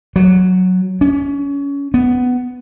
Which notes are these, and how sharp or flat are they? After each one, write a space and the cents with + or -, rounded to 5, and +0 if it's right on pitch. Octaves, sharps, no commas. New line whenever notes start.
F#3 -5
C#4 +25
B3 +10